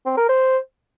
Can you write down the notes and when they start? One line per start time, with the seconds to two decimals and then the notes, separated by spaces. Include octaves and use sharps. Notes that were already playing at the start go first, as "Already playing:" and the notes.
0.06 C4
0.17 A#4
0.29 C5